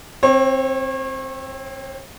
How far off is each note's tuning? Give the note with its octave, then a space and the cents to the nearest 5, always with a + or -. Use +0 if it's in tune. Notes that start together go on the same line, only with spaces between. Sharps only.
C4 +10 C#5 -35